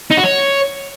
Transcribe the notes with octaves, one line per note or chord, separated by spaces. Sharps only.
D#4
F#4
C#5